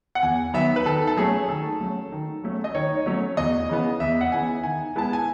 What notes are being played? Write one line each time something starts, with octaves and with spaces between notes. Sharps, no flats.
F#5
E2 G#5
D#3 F#3 B3 E5
B4
D#3 A4
A4
F#3 A3 C#4 G#4
D#3 A4
F#3 A3 C#4
D#3
F#3 A3 C#4
D#5
D#3 C#5
F#3 A3 C#4
E2 D#5
C#3 E3 B3
E2 E5
F#5
C#3 E3 B3 G#5
D#3 G#5
G#3 B3 E4 A5
G#5